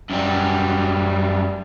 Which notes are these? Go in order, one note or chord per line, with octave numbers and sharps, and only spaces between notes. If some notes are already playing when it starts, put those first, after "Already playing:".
F#2 G3